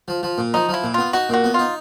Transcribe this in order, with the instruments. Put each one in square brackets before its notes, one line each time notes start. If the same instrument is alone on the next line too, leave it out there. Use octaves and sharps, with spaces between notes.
[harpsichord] F3
F3
A#2
[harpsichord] F3 [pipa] D#4
[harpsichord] F3 [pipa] E4
[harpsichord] A#2
[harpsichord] B3 [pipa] F4
[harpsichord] D#4 [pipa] F#4
[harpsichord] A#2 [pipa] F#4
[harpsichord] B3
[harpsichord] D#4 [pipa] F4